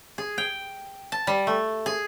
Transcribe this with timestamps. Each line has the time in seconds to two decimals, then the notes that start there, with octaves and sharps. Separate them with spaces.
0.18 G#4
0.38 G5
1.12 A5
1.27 G3
1.47 A3
1.86 G#4